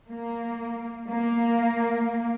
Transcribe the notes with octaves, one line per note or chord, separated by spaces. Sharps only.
A#3
A#3